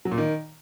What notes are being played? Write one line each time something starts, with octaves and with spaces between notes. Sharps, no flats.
F#3
A#2
D#3